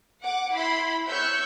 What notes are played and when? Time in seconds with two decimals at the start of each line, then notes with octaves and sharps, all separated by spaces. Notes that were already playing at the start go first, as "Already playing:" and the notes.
0.22 F#5 D6
0.52 E4 B5 C6
1.08 C#5 C#6 E6 F#6 G6